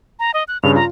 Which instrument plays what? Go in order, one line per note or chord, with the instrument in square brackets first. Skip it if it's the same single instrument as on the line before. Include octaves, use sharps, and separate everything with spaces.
[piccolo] A#5
D#5
F#6
[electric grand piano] G2 C#3 [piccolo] F7
[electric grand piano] F4 [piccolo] A#5